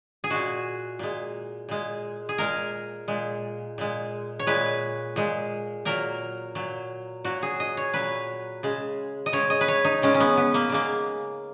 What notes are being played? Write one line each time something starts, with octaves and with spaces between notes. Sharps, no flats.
G#4
A#2 G#3 F#4
A#2 G#3
A#2 G#3
G#4
A#2 G#3 A#4
A#2 G#3
A#2 G#3
C#5
A#2 G#3 B4
A#2 G#3
A#2 F#3 A#4
A#2 F#3
A#2 F#3 F#4
G#4
D#5
C#5
A#2 F#3 B4
C#3 G#3
D#5
C#3 G#3 C#5
D#5
B4
C#5
D#4
C#3 G#3 C#4
C#4
B3
B3
A#3
C#3 G#3 A#3